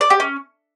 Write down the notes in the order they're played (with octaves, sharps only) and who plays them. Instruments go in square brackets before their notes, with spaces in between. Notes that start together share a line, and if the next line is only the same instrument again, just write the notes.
[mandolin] D5
G4
C#4